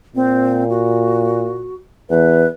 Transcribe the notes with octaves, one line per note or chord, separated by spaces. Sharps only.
A#2 C4
F#4
E2 B4